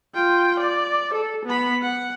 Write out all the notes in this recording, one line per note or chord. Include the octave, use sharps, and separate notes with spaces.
F4 G5
D5
A4
B3 B5
F#5